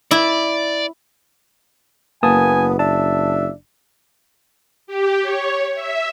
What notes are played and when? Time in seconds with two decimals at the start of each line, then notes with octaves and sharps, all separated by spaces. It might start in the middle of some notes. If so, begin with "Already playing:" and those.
0.11 E4 D5
2.23 F#1 A#3 B3 G#5 A5 D#6
2.79 D4 E5 A5
4.87 G4
5.22 C#5
5.75 E5